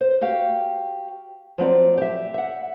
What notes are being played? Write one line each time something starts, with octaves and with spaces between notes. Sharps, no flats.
C5
F#4 G4 F5 G5
F3 F#3 C4 D5
G4 E5
E5 F#5